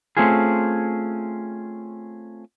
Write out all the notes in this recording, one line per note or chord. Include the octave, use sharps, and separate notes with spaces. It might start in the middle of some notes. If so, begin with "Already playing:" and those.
A3 C4 C#4 F4 G#4